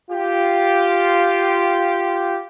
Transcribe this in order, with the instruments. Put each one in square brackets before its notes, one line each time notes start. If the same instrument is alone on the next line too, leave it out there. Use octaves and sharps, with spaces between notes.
[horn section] F4 G4